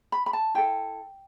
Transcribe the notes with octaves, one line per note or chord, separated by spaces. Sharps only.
B5
B5
A5
E4 A4 G5